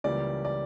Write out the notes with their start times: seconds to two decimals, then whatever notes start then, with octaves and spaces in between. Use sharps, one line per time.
0.04 C#2 C#3 E3 G3 A#3 D5
0.45 D5